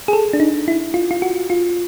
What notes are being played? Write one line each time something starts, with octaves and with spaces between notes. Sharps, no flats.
G#4
A4
D4
D#4
E4
F4
F4
F#4
F4